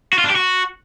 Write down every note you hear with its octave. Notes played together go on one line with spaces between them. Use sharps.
F#4
F4
D4
G4
F#4